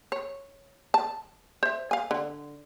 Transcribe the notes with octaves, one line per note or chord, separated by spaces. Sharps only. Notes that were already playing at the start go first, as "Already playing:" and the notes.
C#5
A5
C5 E5
F5 G#5
D3